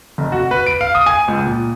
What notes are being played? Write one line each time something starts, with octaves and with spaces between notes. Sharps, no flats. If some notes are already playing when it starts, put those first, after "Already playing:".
F1
F#4
B4
D7
F5
D#6
G#5
C#2
A#2